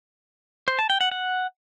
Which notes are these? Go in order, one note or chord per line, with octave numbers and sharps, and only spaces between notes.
C5
A5
G5
F#5
F#5